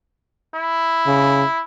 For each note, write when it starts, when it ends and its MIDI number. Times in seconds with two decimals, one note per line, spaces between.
0.55 1.63 64
1.07 1.43 49